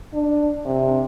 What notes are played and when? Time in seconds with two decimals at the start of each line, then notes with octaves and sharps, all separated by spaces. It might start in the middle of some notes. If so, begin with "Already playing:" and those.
0.13 D4
0.65 C3